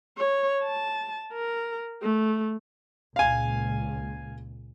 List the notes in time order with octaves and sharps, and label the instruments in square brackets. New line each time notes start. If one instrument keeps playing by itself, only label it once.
[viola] C#5
A5
A#4
A3
[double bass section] C#2 A#2 [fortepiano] F5 G#5